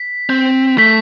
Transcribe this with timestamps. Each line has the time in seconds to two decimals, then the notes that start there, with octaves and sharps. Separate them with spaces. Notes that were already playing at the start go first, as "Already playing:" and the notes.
Already playing: B6
0.29 C4
0.78 A3 B6